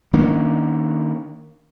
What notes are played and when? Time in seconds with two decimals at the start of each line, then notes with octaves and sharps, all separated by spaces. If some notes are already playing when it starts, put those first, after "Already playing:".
0.13 D#3 A#3 C#4 D4